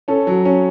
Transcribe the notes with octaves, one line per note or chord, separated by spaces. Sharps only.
C#4 A4
F#3
C#4